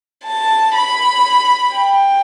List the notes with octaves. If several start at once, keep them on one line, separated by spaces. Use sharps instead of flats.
A5
B5
G5